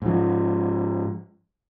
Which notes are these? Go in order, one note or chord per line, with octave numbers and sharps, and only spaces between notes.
G#2 F3